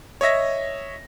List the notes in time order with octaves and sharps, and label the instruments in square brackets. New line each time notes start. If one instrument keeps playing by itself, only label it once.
[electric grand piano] C#5 D#5 E5 A#6